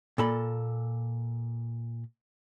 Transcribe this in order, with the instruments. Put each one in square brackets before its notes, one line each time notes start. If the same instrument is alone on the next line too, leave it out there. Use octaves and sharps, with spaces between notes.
[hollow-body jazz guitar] A#2 A4 B5